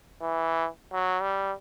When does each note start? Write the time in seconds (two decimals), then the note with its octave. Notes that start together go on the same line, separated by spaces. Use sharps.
0.22 E3
0.93 F#3
1.22 G3